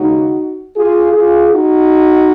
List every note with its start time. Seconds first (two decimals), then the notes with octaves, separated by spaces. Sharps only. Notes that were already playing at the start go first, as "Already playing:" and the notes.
Already playing: D#2 C#3 G#3 D#4 F#4
0.76 F4 G#4
1.14 F4 G#4
1.51 D#4 F#4